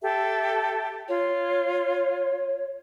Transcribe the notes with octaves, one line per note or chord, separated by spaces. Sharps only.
G4 A4 E5
F4 C#5